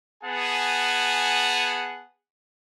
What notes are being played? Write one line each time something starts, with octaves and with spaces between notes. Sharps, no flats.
B3 G#4 F#5 G#5 A5